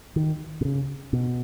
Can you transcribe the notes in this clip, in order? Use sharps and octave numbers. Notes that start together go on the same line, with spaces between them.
D#3
B2
C#3
B2